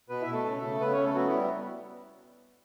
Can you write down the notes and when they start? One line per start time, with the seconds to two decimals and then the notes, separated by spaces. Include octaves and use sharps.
0.09 B2 B3 B4
0.21 E4 E5
0.27 B2
0.33 A3 A4
0.45 C#3
0.62 C#3
0.80 C#3 B3 B4
0.92 C#4 C#5
0.97 C#3
1.04 A3 A4
1.15 F#3 B3 F#4
1.27 E4
1.33 G3